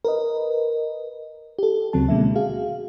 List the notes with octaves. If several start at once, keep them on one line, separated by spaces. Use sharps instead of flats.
A#4 B4 D#5
G4 A4
D2 C#3 F#3 C4 A5
B2 D3 G#3 A#3 C#4 E5
F#4 G#4 F5